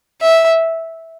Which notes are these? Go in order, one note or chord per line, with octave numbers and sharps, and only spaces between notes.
E5